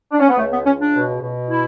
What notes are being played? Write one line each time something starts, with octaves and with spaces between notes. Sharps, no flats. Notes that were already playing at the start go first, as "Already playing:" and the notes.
D4
C#4
B3
C#2 A3
B3
C#2 C#4
D4
B2
B2
E4